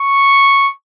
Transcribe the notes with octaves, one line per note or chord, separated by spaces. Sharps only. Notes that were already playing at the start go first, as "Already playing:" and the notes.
Already playing: C#6